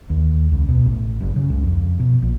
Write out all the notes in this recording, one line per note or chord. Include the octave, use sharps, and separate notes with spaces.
D#2
C#2
B2
A1
F#1
C#3
C#2
F2
B2
A#1